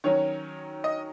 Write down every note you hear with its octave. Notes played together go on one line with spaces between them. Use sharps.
D#3 F#3 C#4 C#5
D#5